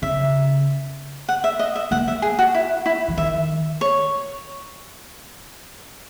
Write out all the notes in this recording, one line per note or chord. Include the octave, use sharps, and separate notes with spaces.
C#3 E5
F#5
E5
D#5
E5
A#3 F#5
E5
G#4
F#4
E4
E4
E3
D#3 E5
C#5